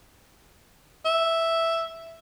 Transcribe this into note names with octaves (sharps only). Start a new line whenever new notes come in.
E5